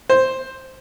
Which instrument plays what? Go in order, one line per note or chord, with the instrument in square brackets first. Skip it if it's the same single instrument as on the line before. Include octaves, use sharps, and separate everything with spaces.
[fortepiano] C5